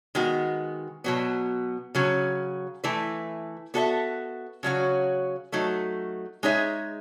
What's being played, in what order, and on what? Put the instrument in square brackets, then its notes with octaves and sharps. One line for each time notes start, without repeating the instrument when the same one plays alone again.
[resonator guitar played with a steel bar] D#3 G#3 B3 F#4
B2 F#3 B3
C#3 F#3 C#4
E3 A3 E4 B4
B3 F#4 A4 C#5 E5
C#3 F#3 C#4 F#4
F#3 A3 D#4
G#3 D#4 G#4 C#5 E5